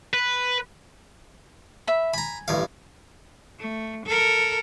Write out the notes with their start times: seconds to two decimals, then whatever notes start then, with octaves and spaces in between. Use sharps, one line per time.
0.14 B4
1.87 E5 B5
2.14 G#5 A#5 B5
2.48 A1 G2 F5
3.59 A3
4.06 A4 A#4